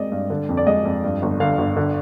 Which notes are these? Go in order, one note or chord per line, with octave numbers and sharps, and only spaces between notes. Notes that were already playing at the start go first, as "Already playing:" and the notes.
Already playing: G#3 C4 D5 D#5
G2
D3
F2
D5
G#3 D#5
F2
G2
G1
D3 F5
G1
D3